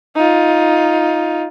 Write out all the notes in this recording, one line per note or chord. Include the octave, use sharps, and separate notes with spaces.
D#4 F4